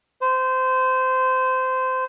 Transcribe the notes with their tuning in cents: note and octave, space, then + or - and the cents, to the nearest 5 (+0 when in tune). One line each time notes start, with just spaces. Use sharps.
C5 -20